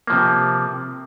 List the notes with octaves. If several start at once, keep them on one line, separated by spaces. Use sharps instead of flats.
C3 F3 A#3